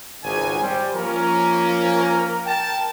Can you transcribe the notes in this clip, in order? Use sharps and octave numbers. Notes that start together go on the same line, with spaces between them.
G#1 C#2 G#5
G3 C5
F3 A#3 C#4 A#4
G5 A5